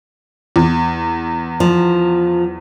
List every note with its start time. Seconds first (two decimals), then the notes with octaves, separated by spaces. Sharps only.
0.56 E2
1.60 F3